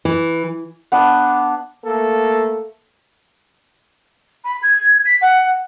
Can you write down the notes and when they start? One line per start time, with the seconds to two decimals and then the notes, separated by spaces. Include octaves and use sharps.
0.05 E3
0.92 B3 D4
1.85 A3 A#3 A4
4.44 B5
4.62 G#6
5.05 B6
5.21 F#5